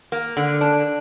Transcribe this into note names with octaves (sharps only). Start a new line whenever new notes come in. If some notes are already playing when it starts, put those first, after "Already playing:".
A#3
D3
D4